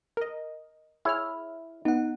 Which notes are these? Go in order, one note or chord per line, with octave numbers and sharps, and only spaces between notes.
A#4 D#5
E4 G#4 C#5 F6
B3 D#4 F#5